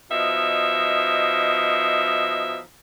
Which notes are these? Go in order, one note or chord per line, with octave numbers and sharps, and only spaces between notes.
B2 F3 D#4 D#5 E5